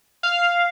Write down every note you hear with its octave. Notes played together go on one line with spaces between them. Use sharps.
F5